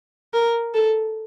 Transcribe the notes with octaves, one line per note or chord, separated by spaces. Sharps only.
A#4
A4